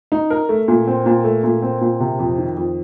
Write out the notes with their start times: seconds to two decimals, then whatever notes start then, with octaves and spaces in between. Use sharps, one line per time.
0.12 D#4
0.30 A#4
0.49 A3
0.68 A#2
0.87 C4
1.06 A#2
1.24 A3
1.44 A#2
1.62 C4
1.81 A#2
2.00 C3
2.19 F2
2.38 D#3
2.57 F2